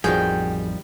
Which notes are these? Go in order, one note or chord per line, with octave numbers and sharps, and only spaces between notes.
A1 F2 D#3 F3 G3 F#4 G#4 G5